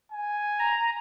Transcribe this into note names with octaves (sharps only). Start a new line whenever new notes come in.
G#5
A#5